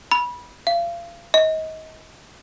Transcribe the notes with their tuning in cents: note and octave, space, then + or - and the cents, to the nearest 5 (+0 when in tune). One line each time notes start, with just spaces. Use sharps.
B5 -20
F5 -35
D#5 +30